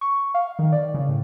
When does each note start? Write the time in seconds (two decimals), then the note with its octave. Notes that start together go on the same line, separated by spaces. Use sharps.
0.01 C#6
0.34 F5
0.59 D#3
0.72 D5
0.94 C#3
1.09 A2